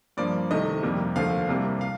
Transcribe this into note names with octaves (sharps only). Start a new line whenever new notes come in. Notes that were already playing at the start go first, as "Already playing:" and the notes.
G2 F3 A#3 D5
C2 C3 D#3 A3 D#5
F2 C3 G3 A#3
D#2 D3 F3 A3 F5
C2 C3 G3 A#3
F5